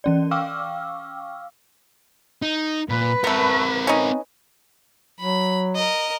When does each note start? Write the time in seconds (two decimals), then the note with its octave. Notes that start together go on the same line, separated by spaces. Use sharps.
0.04 E3 C#4 D5
0.31 F5 G5 C#6 D6 E6 F6
2.42 D#4
2.89 A#2 B4
3.24 A3 B3 C4 A#4
3.87 C#4 D#4
5.20 F#3 B5
5.76 A#4 D#5